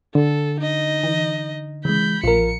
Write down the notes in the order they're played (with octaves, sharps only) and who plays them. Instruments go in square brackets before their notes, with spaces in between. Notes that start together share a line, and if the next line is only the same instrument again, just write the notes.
[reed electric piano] D3 [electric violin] A4
[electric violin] D#4 D#5
[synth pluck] E3
[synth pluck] C#3 [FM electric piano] E3 G#3 [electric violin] B5 G6
[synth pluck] A#1 F3 [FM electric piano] F4 A#4 [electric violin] C#7